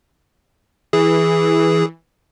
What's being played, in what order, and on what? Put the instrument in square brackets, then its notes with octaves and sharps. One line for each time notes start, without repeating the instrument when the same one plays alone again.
[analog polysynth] E3 [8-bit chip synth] G#4